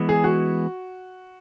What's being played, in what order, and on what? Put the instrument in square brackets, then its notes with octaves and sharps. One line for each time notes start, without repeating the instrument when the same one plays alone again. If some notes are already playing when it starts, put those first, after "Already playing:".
Already playing: [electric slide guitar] E3 G#3 B3
[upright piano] G#4
F#4